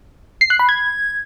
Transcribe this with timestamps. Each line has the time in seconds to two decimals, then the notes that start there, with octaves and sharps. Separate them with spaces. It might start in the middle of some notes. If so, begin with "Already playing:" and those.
0.41 C7
0.50 F#6
0.59 B5
0.69 G#6